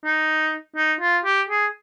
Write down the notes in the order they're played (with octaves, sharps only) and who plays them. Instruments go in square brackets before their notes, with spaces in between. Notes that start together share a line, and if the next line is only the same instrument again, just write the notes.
[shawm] D#4
D#4
F4
G4
G#4